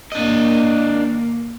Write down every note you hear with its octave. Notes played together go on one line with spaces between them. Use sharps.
G#2 D#3 A#3 D4 D#5